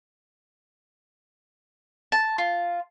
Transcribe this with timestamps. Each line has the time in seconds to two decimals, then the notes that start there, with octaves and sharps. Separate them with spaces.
2.12 A5
2.38 F4